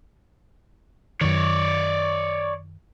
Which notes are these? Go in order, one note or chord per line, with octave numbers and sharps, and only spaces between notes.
F#2 D#3 C#5 D5